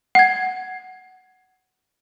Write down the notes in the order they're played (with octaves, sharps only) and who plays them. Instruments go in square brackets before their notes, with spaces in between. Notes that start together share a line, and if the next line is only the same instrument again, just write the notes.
[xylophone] F#5 G#6